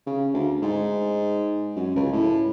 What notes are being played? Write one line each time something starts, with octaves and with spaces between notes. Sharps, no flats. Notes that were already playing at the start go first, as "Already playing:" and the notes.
C#3
D2
G#2
F#2
C#2
A2